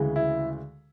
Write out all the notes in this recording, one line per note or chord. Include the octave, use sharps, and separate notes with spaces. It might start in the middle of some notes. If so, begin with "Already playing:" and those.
Already playing: D2 C#3 E3 G#3
E4